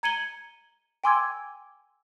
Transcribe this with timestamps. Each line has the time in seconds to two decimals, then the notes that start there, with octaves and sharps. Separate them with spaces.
0.03 A#5 G#6 C#7 D#7 F#7 G7
1.04 G5 G#5 C6 D6 E6 G#6